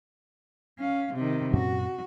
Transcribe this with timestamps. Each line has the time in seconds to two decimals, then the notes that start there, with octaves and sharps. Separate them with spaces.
0.79 C#4 F5
1.15 C3 D#3
1.53 F#2 A#2 C#4 F#4